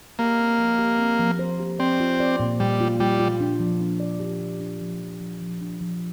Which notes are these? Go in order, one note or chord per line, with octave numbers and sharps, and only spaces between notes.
A#3 G4
C4
F3
G4
C4
F3
C5
G4
C4 D5
F4
D5
A#2
A#2 G3
F4
G3 F4
F4
D4
F3
D4
D5
G4
F3
D4
F3
F3
F3
F3
D4
F3